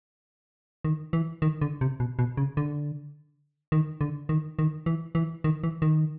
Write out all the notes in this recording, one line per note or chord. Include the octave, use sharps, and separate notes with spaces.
D#3
E3
D#3
D3
C3
B2
B2
C#3
D3
D#3
D3
D#3
D#3
E3
E3
D#3
E3
D#3